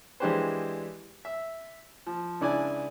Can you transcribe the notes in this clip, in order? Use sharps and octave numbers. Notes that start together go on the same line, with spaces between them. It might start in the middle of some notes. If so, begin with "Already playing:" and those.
E3 G#3 D4 G4 B4 C5
E5
F3
C#2 D4 E4 D5 G#5